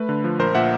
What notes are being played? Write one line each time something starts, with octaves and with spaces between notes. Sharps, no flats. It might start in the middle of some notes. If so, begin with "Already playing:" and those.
Already playing: A3 B4
D3
F3
A#1 A#4 C5
A#2 E5 F#5